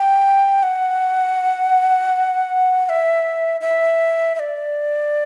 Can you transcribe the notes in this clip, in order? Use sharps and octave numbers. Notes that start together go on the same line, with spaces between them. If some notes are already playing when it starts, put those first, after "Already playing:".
Already playing: G5
F#5
F#5
E5
E5
E5
D5